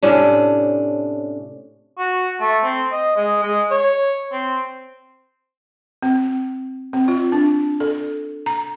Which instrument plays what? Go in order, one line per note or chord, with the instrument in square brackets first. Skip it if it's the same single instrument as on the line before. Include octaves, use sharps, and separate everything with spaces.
[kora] A2 C3 C#4 D4
[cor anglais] F#4
A3
C4
D#5
G#3
G#3
C#5
C4
[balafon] C4
C4
F4
D4
A4
A#5